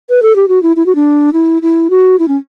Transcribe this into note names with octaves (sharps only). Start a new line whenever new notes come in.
B4
A4
G4
F#4
E4
E4
F#4
D4
E4
E4
F#4
E4
C#4